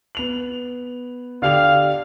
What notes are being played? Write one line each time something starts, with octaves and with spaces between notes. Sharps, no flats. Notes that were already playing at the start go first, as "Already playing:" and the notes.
B3 F7 F#7
D3 G4 F5 F7